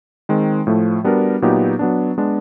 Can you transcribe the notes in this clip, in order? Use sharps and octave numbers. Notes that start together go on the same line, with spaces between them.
D#3 G#3 C4
A2 F3 A3
G3 B3 D4 F#4 A#4
A#2 F#3 B3 D#4 G4
F#3 B3 D4
G#3 B3 D4